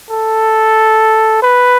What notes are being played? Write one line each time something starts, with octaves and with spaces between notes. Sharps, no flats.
A4
B4